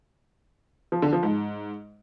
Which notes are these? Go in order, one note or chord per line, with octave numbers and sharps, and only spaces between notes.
F3
D3
F3
G#2